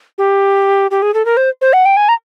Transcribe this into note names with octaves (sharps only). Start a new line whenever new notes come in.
G4
G4
G#4
A4
A#4
C5
C5
F#5
G5
G#5
A#5